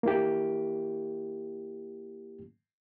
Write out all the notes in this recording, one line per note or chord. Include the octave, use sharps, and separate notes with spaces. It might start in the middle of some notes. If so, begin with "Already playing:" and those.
A#3 E4 G4